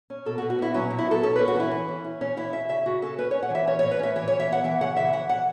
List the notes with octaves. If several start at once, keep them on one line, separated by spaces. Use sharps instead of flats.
C#4
B2 A4
F#4
B2
F#4
B3 E4
F#3 C#4
B2
E4
B3 A4
C#4 A4
C#4 B4
F#4
E3 E4
E3
C#4
C#4
E3 C#4
E3 E4
C#4 E5
C#3 E5
C#3 F#4
C#4 A4
C#4 B4
C#5
C#4
F#5
E3 E5
C#4 C#5
C#5
A2
B4
C#4 E5
E3 C#5
C#5
E3
E5
B3 F#5
E3 E5
C#3 F#5
E3 E5
E3 F#5
E3 F#5